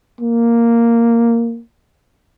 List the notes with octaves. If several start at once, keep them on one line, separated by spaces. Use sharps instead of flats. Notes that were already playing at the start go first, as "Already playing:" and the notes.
A#3